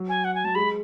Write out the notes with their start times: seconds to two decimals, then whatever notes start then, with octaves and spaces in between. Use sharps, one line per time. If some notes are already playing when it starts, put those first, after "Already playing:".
Already playing: F#3
0.09 G#5
0.25 F#5
0.35 G#5
0.44 F#3 A5
0.55 G#3 B5